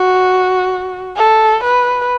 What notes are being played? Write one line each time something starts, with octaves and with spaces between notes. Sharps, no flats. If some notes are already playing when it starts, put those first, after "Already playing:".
Already playing: F#4
A4
B4